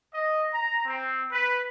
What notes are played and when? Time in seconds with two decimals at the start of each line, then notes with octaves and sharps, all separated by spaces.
0.14 D#5
0.52 A#5
0.85 C4
1.32 B4